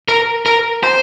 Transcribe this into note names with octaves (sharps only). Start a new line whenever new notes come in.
A#4
A#4
C5